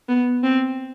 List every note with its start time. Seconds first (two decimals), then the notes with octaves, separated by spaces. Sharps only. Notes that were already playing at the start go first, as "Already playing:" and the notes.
0.08 B3
0.43 C4